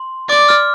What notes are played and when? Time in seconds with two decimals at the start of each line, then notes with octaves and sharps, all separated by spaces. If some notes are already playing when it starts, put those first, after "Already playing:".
Already playing: C6
0.29 D5 D6
0.49 F6